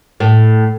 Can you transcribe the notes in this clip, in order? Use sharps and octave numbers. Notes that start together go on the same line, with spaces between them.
A2